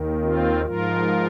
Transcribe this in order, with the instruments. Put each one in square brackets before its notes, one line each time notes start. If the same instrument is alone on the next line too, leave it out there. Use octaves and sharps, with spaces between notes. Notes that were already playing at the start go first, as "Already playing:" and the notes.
Already playing: [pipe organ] D#2 D#3
C4 F4
G#2 F3 F4 A#4